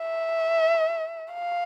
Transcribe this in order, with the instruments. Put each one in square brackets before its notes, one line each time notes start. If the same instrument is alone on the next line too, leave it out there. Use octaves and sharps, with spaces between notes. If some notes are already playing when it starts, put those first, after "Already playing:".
Already playing: [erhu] E5
F5